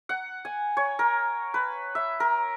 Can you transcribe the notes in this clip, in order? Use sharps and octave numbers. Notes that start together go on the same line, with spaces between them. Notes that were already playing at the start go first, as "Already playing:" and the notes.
F#5
G#5
C#5
A#4
B4
E5
A#4